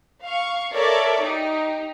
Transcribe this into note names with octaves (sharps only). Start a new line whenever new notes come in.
F5 C#6
A4 A#4 C#5 D5 E5 D6
D#4 G4